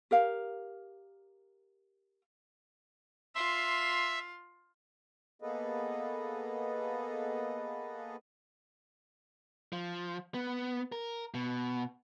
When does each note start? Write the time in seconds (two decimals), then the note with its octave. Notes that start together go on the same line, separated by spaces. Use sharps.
0.11 G4 A#4 F5
3.35 F4 E5 C6
5.42 A#3 B3 G#4 A4 B4 D#5
9.73 F3
10.34 B3
10.92 A#4
11.34 B2